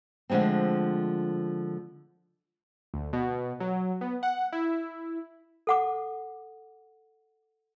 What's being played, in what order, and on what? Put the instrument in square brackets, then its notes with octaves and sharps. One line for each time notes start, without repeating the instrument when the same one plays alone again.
[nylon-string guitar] D3 F3 G#3 A3 C4
[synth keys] D2
B2
F#3
B3
F#5
E4
[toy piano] A4 F#5 D6